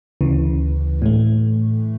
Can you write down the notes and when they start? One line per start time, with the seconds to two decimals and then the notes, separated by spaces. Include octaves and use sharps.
0.21 D2 C#3 E3
1.02 A2 E3 A3